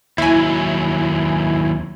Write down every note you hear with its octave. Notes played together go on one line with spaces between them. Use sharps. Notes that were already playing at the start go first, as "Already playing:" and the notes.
D#2 F#3 E4 G#5